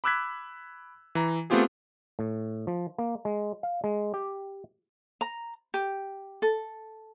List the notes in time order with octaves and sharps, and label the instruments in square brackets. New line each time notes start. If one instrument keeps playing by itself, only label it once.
[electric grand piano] B5 D6 E6 F#6 G#6 B6
E3 A#5
A3 B3 C4 F4 G4 G#4
[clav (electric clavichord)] A2
F3
A#3
G#3
F5
G#3
G4
[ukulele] A#5
G4
A4